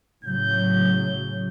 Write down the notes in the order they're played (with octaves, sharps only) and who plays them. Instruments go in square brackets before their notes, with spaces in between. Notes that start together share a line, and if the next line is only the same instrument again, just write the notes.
[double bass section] A2 C#3 F#3 [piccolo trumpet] G6